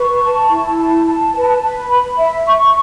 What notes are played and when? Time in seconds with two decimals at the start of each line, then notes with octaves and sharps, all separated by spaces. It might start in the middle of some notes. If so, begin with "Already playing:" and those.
Already playing: B4 C#6
0.22 A5
0.50 E4
0.78 A5
1.06 A5
1.34 B4
1.62 B4
1.90 B5
2.18 E5
2.46 C#6